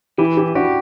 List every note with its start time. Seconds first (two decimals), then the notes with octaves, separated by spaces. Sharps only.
0.18 E3 E4 G4
0.37 E4 G4
0.55 D4 F#4 G4